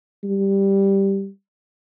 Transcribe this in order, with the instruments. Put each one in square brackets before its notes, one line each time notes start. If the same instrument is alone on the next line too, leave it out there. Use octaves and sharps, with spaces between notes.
[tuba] G3